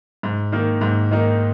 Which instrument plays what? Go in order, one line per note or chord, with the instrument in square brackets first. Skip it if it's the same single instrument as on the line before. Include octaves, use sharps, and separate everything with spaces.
[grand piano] G#2
D#3 A#3 D#4
G#2
D#3 A#3 D#4